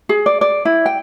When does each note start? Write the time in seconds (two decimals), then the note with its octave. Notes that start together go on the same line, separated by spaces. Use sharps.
0.09 G#4
0.26 D5
0.41 D5
0.65 E4
0.86 G5